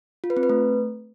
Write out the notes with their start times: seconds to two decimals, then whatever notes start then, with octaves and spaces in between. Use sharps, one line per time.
0.24 F4
0.30 B4
0.37 C4
0.43 B4
0.49 A3